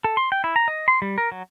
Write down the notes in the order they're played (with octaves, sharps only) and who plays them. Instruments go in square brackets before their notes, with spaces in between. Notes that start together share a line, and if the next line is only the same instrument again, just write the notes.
[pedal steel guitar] A4
C6
G5
E4
A#5
D#5
C6
G3
A#4
F#3